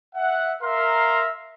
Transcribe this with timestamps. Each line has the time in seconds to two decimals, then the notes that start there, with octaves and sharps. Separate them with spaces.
0.16 E5 F#5
0.62 A#4 E5 F5 A#5 C6